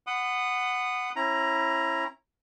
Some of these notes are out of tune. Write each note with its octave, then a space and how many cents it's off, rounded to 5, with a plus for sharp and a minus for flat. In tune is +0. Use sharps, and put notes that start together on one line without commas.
F#5 +0 B5 +35 D#6 -20
C#4 -40 E4 +5 A#5 +5